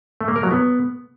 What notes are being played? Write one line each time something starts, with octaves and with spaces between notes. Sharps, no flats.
A3
A#3
A#4
F#3
B3